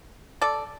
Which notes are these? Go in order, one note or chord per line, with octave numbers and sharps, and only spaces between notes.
A4 D5